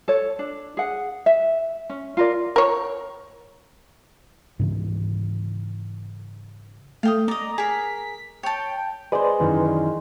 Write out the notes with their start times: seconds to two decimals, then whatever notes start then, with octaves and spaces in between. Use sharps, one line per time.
0.08 A4 C#5
0.39 D4
0.77 G#4 F#5
1.26 E5
1.89 C#4
2.17 F4 A#4 D5
2.56 A#4 C#5
4.59 G#2 C#3 E3
7.03 A3 F5 G5 D#6
7.28 D5 D#5 A#5
7.58 G#4 A#4 B6
8.43 C#5 G5 A5
9.12 G#3 B4 C5 D5
9.40 F#2 D#3 E3